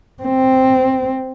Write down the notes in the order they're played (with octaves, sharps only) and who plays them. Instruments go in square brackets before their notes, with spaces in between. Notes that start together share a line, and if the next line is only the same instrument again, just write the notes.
[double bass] C4